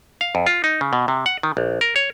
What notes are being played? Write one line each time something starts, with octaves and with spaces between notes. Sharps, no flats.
F5
F2
F4
D#4
C#3
B2
C3
F#5
D#3
A#1
A#4
C#5